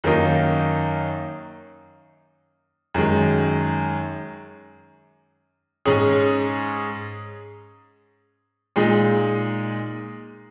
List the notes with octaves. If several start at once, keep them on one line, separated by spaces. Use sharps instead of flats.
F#2 D#3 A#3 D#4
F#2 D#3 G#3
G#2 G#3 C#4 G#4
A#2 G#3 D#4